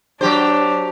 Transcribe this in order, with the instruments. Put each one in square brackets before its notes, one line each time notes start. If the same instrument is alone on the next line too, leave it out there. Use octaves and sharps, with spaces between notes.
[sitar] F#3 G4 C5 [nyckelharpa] D4